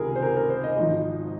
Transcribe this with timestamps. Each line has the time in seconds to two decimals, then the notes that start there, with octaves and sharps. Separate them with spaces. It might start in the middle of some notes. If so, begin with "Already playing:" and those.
Already playing: C#2 C3 D#3 G#4 A#4
0.16 C5
0.22 A#4
0.37 A#4
0.50 C5
0.64 D#5
0.76 G#1 G#2 F3